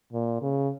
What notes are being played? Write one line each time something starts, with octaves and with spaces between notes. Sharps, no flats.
A#2
C#3